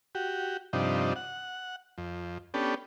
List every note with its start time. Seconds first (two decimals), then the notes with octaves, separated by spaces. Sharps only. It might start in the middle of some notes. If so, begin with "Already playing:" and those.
0.15 F#4 G4
0.73 G2 C3 F3 D4 D#4
1.16 F#5
1.98 F2
2.54 B3 C#4 D4 G4 A4